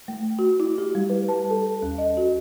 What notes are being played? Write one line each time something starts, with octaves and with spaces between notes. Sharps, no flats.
A3
F#4
E4
G4
G3
B4
A5
A4
D#2
D#5
F#4